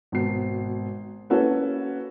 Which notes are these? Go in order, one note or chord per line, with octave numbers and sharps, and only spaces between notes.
G#1 B2 C7
A#3 C#4 E4 F#4 A4 B4